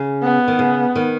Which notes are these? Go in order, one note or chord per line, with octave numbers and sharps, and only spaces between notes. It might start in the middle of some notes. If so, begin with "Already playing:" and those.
Already playing: C#3
B3
D#3
C#3
D#3